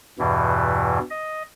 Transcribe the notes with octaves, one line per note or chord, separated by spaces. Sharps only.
E2 G2 B2 E3
D#5